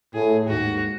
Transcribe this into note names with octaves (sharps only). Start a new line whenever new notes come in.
A2 G#4
D#2 G#2 F#4